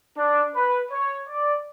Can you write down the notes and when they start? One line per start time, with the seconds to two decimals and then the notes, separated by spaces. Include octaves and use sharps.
0.17 D4
0.55 B4
0.91 C#5
1.27 D5